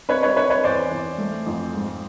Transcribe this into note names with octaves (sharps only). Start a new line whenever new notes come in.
C4 B4 C#5
B4 C#5
C4 B4 C#5
B4 C#5
E2 C5 D5
E2
A3
F2
G#2